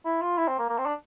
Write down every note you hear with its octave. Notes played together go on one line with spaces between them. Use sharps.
E4
F4
E4
C4
A#3
A#3
C4
D4